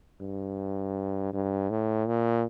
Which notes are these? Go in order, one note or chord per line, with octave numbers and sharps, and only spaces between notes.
G2
G2
A2
A#2